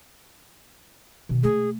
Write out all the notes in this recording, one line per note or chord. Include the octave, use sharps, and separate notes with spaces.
B2 D#3
A3 G#4